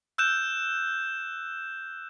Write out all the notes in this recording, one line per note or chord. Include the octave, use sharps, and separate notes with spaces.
E6 F#6 G6 E7